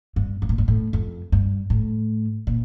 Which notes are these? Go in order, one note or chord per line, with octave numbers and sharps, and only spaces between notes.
G2
G2
A2
G2
A2
F2
G2
A2
A#2